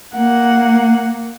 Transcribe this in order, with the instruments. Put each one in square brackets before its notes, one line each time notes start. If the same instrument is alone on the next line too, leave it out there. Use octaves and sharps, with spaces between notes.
[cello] A#3 [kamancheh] F#5